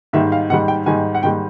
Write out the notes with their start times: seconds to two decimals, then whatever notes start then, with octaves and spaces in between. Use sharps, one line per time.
0.13 G#2 D#3 G3 E5
0.32 F5
0.50 G#2 D#3 G3 F#5
0.68 G5
0.86 G#2 D#3 G3 G#5
1.15 F#5
1.23 G#2 D#3 G3 G5